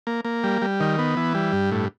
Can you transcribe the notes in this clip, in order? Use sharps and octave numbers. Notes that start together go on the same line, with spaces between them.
A#3
A#3
G3
G3
D#3
B3
E3
G3
G2
A2